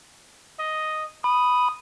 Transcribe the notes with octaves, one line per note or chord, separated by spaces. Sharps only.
D#5
B5 D#6